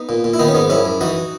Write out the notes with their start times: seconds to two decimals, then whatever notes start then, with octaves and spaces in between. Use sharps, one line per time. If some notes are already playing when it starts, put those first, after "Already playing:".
Already playing: B3 D#4
0.09 A#2
0.24 A#2
0.34 E4
0.39 D#3 B3 D#4
0.48 C#4
0.54 G#2 B3 D#4
0.69 F#2 C#4 E4
0.85 F#2
1.01 E3 D#4 F#4